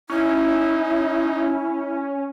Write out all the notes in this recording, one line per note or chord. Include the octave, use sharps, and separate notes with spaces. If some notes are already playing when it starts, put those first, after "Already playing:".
C#4 D#4 E4